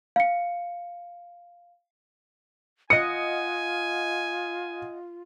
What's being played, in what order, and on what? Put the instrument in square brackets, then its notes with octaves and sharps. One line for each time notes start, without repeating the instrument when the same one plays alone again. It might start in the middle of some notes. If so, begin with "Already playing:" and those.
[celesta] F5 C#7
[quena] F4 [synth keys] D#5 F#5 D#6 [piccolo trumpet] G#5 [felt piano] C#7